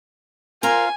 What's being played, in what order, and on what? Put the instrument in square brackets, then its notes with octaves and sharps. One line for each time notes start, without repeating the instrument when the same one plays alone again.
[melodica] F4 F5 [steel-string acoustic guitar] A#4 C5 A#5 [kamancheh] G#5